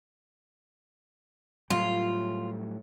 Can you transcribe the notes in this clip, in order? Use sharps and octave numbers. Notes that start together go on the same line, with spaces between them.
A2 F#3 G3 F4